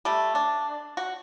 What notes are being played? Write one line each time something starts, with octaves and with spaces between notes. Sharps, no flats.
G3 A3
D4
F#4